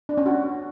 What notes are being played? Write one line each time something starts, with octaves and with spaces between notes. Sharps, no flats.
D4
C#4
F#4